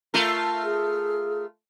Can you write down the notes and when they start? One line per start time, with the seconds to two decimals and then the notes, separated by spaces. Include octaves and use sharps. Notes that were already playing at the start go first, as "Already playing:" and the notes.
0.14 A3 F4 A#4
0.64 G#4